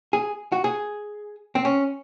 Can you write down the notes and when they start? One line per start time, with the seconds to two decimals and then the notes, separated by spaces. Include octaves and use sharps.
0.13 G#4
0.52 F#4
0.64 G#4
1.55 C4
1.65 C#4